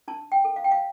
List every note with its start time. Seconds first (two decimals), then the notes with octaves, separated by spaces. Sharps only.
0.08 D4 A5
0.32 G5
0.44 A4
0.56 F5
0.64 G5
0.71 F5